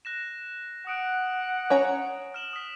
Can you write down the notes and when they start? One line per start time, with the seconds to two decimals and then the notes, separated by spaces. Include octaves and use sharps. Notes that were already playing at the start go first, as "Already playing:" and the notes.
0.05 F#6 A#6 E7
0.87 F#5 D#6 D7
1.70 C#4 C#5 A#5
2.34 F6 E7 F#7
2.53 D#6 B6